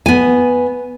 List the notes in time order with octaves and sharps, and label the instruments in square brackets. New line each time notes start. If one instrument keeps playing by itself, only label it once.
[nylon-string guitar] B3 G#5